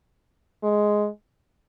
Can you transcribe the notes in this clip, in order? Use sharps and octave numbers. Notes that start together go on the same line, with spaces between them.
G#3